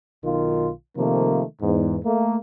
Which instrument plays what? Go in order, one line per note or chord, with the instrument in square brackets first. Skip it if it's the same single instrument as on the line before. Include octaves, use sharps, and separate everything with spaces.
[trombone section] B1 D#3 F4
C3 D#3 F3 A3 A#3
E2 G#2
A3 A#3